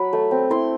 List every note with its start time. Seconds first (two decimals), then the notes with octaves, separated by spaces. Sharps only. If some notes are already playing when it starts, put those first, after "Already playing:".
Already playing: F#3 B5
0.13 A3
0.31 C4
0.50 E4 C6